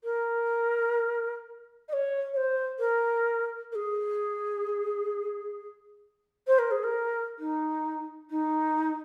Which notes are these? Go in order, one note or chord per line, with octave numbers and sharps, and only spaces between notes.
A#4
D#5
C#5
C#5
C5
A#4
A#4
G#4
C5
A#4
G#4
A#4
D#4
D#4